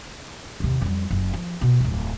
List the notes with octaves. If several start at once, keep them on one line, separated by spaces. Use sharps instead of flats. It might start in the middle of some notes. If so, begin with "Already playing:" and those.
D#2 C3
F2 G3
F#1
F3
B2
D1 F2